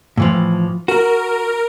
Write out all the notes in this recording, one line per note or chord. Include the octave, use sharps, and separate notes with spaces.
A2 E3 F3
F#4 A#4